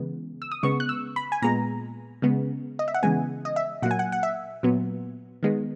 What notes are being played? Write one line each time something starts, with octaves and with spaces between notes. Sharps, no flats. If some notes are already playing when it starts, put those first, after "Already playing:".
Already playing: C#3 E3 G#3 B3
E6
D#6
C#3 G#3 B3 C#6
F#6
E6
B5
G#5
A#2 G#3 B3 A#5
C#3 G#3 B3
D#5
E5
F#5
C#3 E3 G#3 B3 G#5
D#5
E5
A#2 F#3 A#3 F#5
G#5
F#5
F#5
E5
A#2 F#3 B3
D#3 G#3 B3